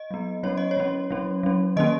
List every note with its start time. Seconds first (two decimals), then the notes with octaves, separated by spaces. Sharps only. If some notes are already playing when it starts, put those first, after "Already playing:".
Already playing: D#5
0.11 F#3 B3
0.43 F#3 C#4 C#5
0.57 D#5
0.71 C#5
0.77 F#3 C#4
1.11 F#3 C#4
1.43 F#3 C#4
1.76 D#3 A#3 C#4 D#5